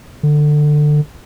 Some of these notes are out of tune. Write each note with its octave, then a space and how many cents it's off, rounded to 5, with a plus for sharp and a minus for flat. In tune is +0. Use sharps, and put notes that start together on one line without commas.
D3 +20